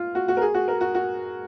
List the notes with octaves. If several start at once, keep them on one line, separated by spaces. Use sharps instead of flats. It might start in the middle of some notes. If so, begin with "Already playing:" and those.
Already playing: F4
F#4
F#4
A#4
G#4
F#4
A#4
F#4
F#4